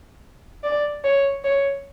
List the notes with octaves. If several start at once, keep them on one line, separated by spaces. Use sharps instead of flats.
D5
C#5
C#5